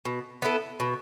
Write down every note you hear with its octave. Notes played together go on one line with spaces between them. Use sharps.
B2
B3 E4 A4
B2